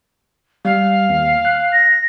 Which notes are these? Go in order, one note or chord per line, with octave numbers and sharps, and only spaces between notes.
G3 F5
D#2
F#6
A#6